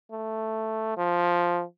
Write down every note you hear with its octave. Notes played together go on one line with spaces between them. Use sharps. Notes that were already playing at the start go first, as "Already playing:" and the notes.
A3
F3